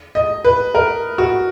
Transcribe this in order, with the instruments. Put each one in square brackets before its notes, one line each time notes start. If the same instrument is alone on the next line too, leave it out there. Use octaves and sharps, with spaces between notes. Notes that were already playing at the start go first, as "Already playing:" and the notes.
[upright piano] D#5
B4
A#4
F#4